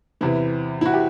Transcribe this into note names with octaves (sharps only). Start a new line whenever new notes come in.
E2 C3 E3 E4
E4
F#4
G4